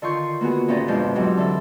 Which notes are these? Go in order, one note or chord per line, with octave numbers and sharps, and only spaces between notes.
D3 D#3 F4 C6 C#6 G6
A#3 B3 F#4 G#4
D2 A#2 C#4 G4 D5 A#5
F2 B2 F3 G#3 D4 G6
G#2 F#3 C4 G4
D3 E3 A4